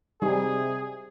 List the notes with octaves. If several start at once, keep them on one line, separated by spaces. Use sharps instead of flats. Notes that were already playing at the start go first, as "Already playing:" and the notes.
C3 G3 D#4 G#4